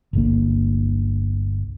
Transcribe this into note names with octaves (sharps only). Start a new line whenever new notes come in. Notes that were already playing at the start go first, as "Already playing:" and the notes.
G1 C2 D3 A#3